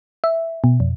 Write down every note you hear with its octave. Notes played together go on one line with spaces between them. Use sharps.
E5
B2
F2